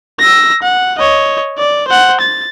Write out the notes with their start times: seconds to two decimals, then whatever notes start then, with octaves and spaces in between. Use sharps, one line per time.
0.19 E6 A#6
0.63 F#5
0.99 C#5 D#5
1.58 D5
1.88 C5 F#5
2.21 A6